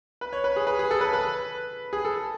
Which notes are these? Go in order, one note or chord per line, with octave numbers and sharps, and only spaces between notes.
B4
C#5
B4
G#4
B4
G#4
A4
B4
B4
G#4
A4